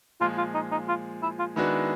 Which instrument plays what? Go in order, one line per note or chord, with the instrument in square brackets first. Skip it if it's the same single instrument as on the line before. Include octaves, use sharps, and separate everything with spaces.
[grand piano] A#2 F3 G#3 [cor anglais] F4
[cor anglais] F4
D#4
D#4
F4
E4
F4
[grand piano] D#3 G#3 B3 D4 F#4 [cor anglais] E4